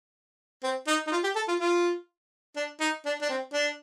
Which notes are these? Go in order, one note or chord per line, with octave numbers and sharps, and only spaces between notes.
C4
D#4
D#4
F4
G4
A4
F4
F4
D4
D#4
D4
D4
C4
D4